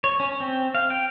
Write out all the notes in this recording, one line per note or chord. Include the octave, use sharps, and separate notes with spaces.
C#5
C#4
C4
F5
G5